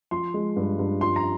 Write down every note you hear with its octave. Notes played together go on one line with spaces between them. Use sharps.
F3 C6
G#3
G2
G2
F3 C6
A#5